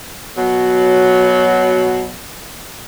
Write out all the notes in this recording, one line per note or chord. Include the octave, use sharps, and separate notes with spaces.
B2 F#3